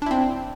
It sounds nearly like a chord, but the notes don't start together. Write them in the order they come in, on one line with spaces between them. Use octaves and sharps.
D4 E4 C4